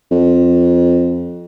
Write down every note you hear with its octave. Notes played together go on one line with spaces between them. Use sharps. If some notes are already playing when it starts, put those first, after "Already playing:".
F2